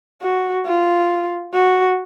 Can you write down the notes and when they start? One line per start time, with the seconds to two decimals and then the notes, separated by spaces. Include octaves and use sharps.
0.22 F#4
0.66 F4
1.54 F#4